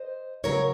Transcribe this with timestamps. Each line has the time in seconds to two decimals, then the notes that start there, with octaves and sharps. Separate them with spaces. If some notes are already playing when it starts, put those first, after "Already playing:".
Already playing: C5 D#5
0.44 C#3 F#3 A#4 C#5